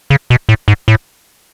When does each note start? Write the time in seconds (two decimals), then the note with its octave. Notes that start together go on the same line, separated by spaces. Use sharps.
0.10 C#3
0.30 B2
0.49 A2
0.68 G#2
0.88 A2